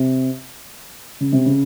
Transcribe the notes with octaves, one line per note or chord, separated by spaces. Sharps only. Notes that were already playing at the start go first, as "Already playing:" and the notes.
Already playing: C3
C#3
C3
C#3